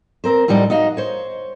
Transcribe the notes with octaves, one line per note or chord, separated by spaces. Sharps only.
C4 A#4 C5
F#2 A2 F3 G3 C4 D#4
D#4 F#4 D#5 F5
C5 C#5